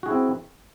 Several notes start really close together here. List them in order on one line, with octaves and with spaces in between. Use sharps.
F#4 G#4 E4 C4